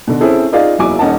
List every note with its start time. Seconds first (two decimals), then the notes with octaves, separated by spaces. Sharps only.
0.07 B2 D3
0.20 C4 C#4 E4 G#4 A4
0.52 D#4 F4 G#4 D5 F5
0.78 F#1 E2 F#3 E4 G#5 D6
0.99 D#1 C#4 D#4 F#5 A5